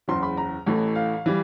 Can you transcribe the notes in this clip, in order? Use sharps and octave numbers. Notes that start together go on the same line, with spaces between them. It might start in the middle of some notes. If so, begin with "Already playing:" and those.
F#1 E2 C#3 C6
B5
A#5
A1 A2 E3 A3
F5
E3 G3